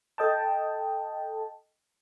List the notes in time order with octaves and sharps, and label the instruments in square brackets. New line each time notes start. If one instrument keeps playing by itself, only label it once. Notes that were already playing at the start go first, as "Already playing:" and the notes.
[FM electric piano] A4 D#5 G5 A5